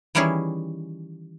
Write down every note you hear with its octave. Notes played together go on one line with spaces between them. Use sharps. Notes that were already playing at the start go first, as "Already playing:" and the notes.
D#3 E3 G3 C#4 E4 G#4